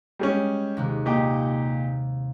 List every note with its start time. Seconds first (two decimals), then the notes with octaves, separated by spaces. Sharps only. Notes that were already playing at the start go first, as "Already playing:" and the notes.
0.19 G3 G#3 C#4
0.77 D#2 C3 G#3
1.06 A#2 D#4 G4